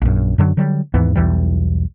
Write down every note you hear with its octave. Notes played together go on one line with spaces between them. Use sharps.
A#1 F#2
F#2 D3 F#3
D3 F#3 G3
D#2 G#2 E3 B3
B1 E2 E3 G3